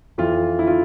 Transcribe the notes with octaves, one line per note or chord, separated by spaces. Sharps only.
F2 E3 F4
E4
F4